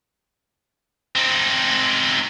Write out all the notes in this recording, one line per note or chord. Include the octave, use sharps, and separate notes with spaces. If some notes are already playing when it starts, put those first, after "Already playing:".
C4 D#4